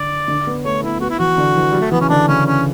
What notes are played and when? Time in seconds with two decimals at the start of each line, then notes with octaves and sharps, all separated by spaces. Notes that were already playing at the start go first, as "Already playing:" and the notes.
Already playing: D3 D5
0.28 D3
0.47 B3
0.64 A3 C#5
0.83 B3 E4
1.00 B3 F#4
1.10 E4
1.19 E3 F#4
1.38 D3
1.56 E3
1.71 F#3 G3
1.81 A3
1.91 E3 B3
2.00 C#3 C#4
2.09 D3 D4
2.28 C#3 C#4
2.46 C#4